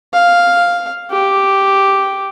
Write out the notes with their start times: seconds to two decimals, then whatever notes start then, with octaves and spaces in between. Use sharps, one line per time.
0.13 F5
1.11 G4